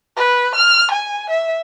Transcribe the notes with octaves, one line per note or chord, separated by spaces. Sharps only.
B4
F6
G#5
E5